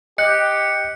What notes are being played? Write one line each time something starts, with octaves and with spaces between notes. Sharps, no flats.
G4 D#5 F#6 C#7